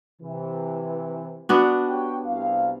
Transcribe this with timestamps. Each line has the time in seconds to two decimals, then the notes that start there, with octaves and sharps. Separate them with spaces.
0.22 C3 E3
1.49 B3 D4 F#4
1.88 G4 C#5 G5
2.26 C2 C3 F5